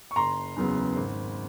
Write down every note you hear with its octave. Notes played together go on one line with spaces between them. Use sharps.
C#6
F#1 A#5 C6
E2 C#3 F#3 B3
G#1